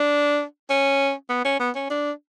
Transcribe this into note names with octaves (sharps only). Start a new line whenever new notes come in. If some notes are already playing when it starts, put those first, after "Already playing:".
Already playing: D4
C#4
B3
C#4
B3
C#4
D4